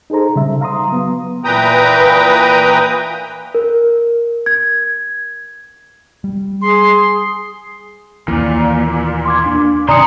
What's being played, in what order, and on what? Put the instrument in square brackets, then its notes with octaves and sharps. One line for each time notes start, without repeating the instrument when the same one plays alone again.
[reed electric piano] D#4 G#4 A4 C5 A#5
C#3 G3 E5
F5 A#5 C6 D#6
F#3 B3
[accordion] A#2 E3 B4 G5 A#5 D#6
[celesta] A#4
G#6
[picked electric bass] G3
[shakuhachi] G#4 [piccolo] C6
[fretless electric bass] D#2 E3 [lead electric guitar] A#2
[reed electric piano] C6 D6 G#6
D4
[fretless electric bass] C3 D#3 [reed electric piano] D5 [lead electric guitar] G#5 C6 [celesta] A#5 D#6 C#7